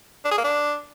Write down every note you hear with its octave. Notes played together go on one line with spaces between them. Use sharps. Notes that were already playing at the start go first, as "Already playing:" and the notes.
D4
G#4
A#3
D4